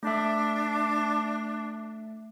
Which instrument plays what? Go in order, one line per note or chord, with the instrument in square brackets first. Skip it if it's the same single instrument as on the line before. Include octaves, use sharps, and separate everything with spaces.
[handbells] A3 E5 [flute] D4